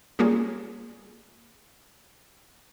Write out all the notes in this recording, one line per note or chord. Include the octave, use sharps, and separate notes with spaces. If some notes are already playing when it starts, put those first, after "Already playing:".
G3 A#3 C#4 F4 G#4